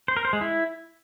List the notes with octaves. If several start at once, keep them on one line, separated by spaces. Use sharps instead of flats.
C5
A#4
C5
G#3
E4